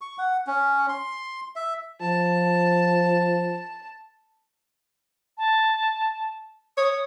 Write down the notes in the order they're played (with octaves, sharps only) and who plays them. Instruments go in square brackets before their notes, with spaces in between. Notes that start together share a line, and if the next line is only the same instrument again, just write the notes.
[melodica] C#6
F#5
C#4
C6
E5
[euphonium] F3 [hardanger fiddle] A5
[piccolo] A5
[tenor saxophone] C#5 [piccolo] D#6